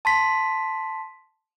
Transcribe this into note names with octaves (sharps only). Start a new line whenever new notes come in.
A5 C6 B6